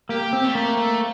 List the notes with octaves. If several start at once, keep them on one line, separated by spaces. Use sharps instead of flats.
A#3 G4
C4
A3
A#3
A3